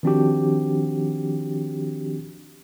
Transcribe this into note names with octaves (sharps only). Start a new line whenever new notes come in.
D#3 F3 C4 D4 F#4 G4